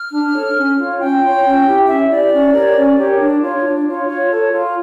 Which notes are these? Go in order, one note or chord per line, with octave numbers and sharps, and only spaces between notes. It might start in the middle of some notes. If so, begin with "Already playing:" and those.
Already playing: F6
D4
A4 C#5
C#4
F4 C#5
C#4 G5
F4 C#5
C#4
E4 G4
C#4 E5
E4 G4 D5
C#4
G4 A#4 C#5
C#4
G4 A#4 C#5
D4
F4 C#5
D4
F4 C#5
F4 C#5
A4 C#5
F4